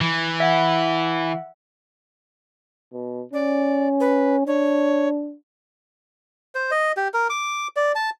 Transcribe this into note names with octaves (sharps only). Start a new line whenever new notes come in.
E3
E5 F#5
B2
C#4 D5
B4
D4 C#5
C5
D#5
G4
A#4
D6
D5
A5